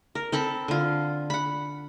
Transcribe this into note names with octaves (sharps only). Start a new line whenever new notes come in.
A#4
C4 A4 A5 B5
D3 F4
F#5 B5